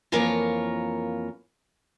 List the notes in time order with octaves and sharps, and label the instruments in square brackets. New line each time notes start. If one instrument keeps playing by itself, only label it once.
[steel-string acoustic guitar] F2 E3 A#3 F4 A#4 C#5